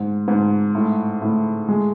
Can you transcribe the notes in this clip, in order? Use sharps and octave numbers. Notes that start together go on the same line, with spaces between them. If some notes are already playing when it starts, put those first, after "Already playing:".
Already playing: G#2
G#2
A2
A2
G#3